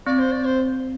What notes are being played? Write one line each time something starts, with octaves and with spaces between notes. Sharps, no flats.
C4 D5
C5
D5
C5